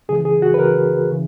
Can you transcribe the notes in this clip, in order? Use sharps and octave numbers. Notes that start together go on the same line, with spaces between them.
C#2 C#3 E3 G#4
G#4
F#4
B4
C#2 C#3 E3 A#4
C#3 E3